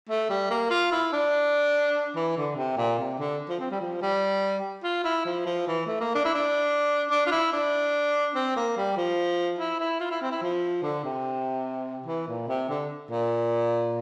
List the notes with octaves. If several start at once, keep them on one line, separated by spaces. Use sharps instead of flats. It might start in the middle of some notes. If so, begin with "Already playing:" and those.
A3
G3
A#3
F4
E4
D4
E3
D3
C3
A#2
C3
D3
F3
C4
G3
F3
G3
F4
E4
F3
F3
E3
A3
A#3
D4
E4
D4
D4
F4
E4
D4
C4
A#3
G3
F3
E4
E4
F4
E4
C4
E4
F3
D3
C3
E3
A#2
C3
D3
A#2